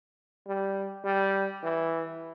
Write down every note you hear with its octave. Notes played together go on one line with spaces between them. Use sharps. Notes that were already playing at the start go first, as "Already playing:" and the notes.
G3
G3
E3